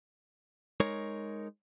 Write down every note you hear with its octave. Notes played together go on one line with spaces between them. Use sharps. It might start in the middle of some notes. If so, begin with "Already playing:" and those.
G#3 D#4 A#4 C#5